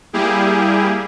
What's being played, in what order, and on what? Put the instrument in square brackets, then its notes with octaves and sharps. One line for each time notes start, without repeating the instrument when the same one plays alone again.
[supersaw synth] G3 A#3 E4 G4 G#4